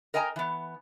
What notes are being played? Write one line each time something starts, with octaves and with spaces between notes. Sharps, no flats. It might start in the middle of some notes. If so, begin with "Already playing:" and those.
A#4 D#5 G5 G#5 A#5
E3 B3